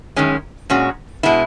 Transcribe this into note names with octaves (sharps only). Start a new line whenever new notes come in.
F#2 D#3 G#3 C#4
A#2 G#3 C#4 F#4
B2 G#3 B3 E4